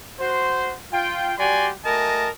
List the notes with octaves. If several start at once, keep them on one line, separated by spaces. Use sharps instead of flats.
F#4 C5
F4 G5
G3 F#4 G4 D5 G#5 C6
A3 F#4 A#4 D#5 G#5 A5